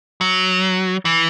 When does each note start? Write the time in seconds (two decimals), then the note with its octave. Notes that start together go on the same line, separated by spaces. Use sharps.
0.21 F#3
1.05 E3